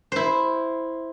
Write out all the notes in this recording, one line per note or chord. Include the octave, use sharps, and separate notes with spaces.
E4 C5